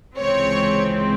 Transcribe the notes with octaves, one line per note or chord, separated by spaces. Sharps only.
C#2 C3 E3 G#3 C4 C#5